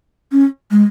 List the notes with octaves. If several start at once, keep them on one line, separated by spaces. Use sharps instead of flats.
C#4
G#3